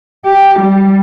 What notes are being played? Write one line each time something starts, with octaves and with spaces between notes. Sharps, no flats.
G4
G3